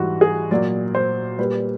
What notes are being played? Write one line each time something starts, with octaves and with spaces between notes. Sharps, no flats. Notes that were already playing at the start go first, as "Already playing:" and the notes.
Already playing: G#2 E3 G3 F#4
G#4
A#2 F#3 D5
C5
A#2 G3 B4